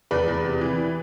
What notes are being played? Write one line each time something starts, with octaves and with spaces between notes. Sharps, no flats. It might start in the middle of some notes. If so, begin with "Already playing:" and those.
E2 B4 D5
E2
C3
E3